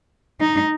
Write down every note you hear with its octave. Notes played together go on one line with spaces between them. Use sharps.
D#4